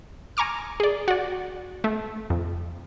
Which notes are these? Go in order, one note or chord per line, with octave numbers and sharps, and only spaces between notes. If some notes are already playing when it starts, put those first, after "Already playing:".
G#5 A#5 C#6 D6 F6
G#4 D5
F#4 D5
A3
F2